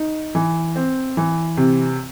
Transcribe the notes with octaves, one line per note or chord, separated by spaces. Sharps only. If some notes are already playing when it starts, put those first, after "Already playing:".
Already playing: D#4
E3
C4
E3
C3